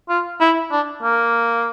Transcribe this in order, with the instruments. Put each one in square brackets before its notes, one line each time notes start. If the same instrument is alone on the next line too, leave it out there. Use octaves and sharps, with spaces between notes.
[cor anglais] F4
E4
D4
A#3